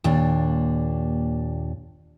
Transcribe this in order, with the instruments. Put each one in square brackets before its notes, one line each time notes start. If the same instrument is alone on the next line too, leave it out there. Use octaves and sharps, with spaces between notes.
[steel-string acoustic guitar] D#2 A#2 D4